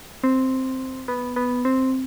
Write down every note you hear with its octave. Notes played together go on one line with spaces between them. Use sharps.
C4
B3
B3
C4